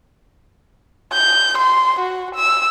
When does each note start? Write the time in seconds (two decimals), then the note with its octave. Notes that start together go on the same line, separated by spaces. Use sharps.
1.13 G6
1.58 C6
2.00 F#4
2.35 E6